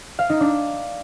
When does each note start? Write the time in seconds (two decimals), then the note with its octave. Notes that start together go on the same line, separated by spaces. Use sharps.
0.19 F5
0.29 D#4
0.40 D4